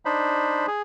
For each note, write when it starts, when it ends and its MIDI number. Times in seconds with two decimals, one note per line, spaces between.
0.05 0.66 62
0.05 0.66 63
0.05 0.66 72
0.05 0.66 83
0.67 0.82 68